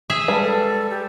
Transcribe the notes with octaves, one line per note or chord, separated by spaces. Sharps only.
G#4 E5
G3 G#3 B4 A5
A4
G4